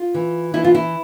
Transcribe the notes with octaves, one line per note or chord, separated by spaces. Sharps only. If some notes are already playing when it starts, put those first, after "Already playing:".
Already playing: F4
E3
E3 E4
F4
E4